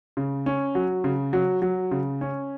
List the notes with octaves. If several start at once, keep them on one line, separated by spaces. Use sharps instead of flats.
C#3
C#4
F#3
C#3
F#3
F#3
C#3
C#4